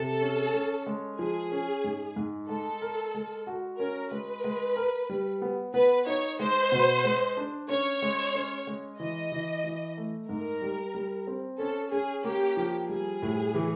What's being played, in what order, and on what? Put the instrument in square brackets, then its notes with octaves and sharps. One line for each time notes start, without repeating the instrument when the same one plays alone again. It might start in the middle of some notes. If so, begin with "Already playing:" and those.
Already playing: [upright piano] C3 [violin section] A4
[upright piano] C#4
C#4
G#3
[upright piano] F3 [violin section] G#4
[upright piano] C#4
G#2
G#2
[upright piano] G#3 [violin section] A4
[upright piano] A#4
G#3
F#4
[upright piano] C#4 [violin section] A#4
[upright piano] G#3 [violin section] B4
[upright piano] G#3
A#4
G3
B3
[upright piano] B3 [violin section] B4
[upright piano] D#4 [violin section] C#5
[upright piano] G#3 [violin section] C5
[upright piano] B2
G#3
D4
[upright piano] C#4 [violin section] C#5
[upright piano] G#3
C#4
G#3
[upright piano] E3 [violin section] D#5
[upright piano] E3
E3
A3
[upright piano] G#2 [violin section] A#4
[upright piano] G3
G3
C4
[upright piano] C#4 [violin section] A4
[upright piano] C#4 [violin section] G#4
[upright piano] A#3 [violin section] G4
[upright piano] F3
[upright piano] G3 [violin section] G#4
[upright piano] A2
E3